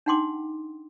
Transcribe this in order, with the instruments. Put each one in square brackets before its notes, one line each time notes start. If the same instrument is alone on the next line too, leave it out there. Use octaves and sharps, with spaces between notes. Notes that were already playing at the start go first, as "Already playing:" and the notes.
[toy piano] D4 D#4 F#5 G5 C6 D6